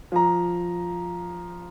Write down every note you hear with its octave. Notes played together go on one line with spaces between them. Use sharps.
F3 A#5